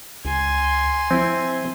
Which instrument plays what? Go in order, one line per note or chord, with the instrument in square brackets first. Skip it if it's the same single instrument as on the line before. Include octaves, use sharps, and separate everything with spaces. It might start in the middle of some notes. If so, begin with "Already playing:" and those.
[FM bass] C#2 [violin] G#5 C6
[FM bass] F3 [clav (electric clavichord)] C4 E4